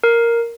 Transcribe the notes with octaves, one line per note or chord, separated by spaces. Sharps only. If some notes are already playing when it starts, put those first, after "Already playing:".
A#4